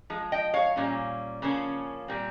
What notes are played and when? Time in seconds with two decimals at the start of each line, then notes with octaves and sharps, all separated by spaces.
0.10 F3 G#3
0.32 D#5 G5
0.54 C#5 F5
0.76 A#2 G3 C#4
1.42 C#3 F3 A#3 C#4
2.08 A#2 G3 C4